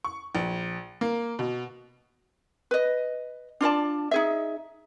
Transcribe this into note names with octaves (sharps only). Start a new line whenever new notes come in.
C#6
A#1
A#3
B2
B4 D#5
D4 F4 D5 A5
D#4 G#4 E5